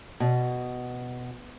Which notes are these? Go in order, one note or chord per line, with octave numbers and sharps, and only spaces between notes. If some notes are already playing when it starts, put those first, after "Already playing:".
B2